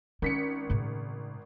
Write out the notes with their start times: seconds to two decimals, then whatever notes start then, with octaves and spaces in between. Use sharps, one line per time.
0.22 G#1 C#4 B6 C#7
0.70 A2 C#3